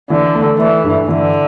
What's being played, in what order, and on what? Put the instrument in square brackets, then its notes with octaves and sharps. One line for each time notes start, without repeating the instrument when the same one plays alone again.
[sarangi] D3 [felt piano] E3
[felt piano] A3
[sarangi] E3 [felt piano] A3
[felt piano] G2
[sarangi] D3 [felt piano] E3